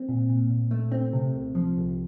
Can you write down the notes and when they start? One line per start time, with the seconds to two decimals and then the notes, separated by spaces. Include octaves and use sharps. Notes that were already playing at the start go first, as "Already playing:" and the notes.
Already playing: C4
0.09 A#2
0.30 A#2
0.49 A#2
0.71 A3
0.92 C4
1.13 C3
1.34 C2
1.55 F3
1.77 C2